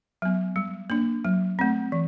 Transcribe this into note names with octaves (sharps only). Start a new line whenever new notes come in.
F#3 B3
G3
A#3 D4
F#3
A3 C4
E3